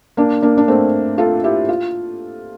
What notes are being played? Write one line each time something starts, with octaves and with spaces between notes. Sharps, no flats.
A#3 D4
A#3 D4
D4
A3 C4
F4 A4
E4 G4
F4